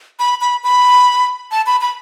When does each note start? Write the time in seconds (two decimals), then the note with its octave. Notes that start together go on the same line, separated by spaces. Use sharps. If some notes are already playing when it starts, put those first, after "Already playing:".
0.19 B5
0.41 B5
0.64 B5
1.51 A5
1.66 B5
1.81 B5